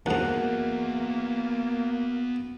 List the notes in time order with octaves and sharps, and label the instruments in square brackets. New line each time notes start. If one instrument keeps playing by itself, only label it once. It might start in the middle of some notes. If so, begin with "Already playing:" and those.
[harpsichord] D#2 G#2 [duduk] A#3 [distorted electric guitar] B3 G#4 [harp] F#4 A#4 F#5